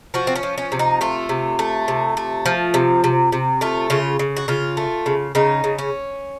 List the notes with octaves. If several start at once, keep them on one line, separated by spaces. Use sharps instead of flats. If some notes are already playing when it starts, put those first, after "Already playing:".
F3 F#4
C4
C#4
F3
C#4
C3
D#4
A3 F4
C3
A3
C3
A3
F3
C3
C3
C3
A3 F4
C#3 F4
C#3
F#4
C#3 F4
A3
C#3
C#3 D#4
C#3
C#4